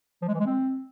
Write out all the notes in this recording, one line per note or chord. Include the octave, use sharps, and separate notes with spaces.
F3
G#3
E3
G#3
C4